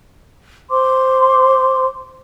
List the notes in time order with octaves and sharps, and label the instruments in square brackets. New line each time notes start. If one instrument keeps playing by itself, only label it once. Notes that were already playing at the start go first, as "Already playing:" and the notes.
[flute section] C5 C6 D6